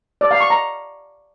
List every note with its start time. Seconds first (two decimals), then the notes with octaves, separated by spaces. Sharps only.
0.21 D5
0.31 F5
0.41 C#6
0.50 A#5